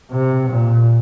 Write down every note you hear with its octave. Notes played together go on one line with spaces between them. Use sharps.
C3
A#2